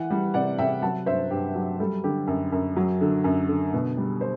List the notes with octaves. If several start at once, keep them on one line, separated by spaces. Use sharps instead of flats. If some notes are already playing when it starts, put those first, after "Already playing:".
Already playing: E3 F#5
G3
C3 D5 F#5
C3 E5 G5
F#3 F#5 A5
G2 C5 E5
G2 G4
F#3 G4
G3 A4
D3 G4
F#2
F#2
F#3
D3
F#2
D3
B2
G3
C5